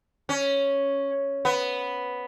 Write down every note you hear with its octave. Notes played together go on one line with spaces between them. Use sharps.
C#4
B3